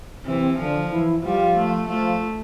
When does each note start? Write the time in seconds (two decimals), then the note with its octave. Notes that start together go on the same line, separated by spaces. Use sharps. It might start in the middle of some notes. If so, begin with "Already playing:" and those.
0.24 C3 E3 C4
0.57 D3 F3 D4
0.91 E3 E4
1.23 F3 G3 F4
1.56 A3
1.88 F3 A3 F4